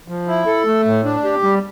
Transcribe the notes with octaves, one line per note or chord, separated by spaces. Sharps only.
F3
E4
A4
A3
A2
D4
G4
G3